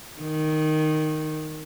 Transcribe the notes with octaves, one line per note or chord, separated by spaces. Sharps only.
D#3